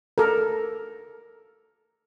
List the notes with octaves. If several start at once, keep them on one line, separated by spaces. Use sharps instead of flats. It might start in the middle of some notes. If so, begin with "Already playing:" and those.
A4 A#4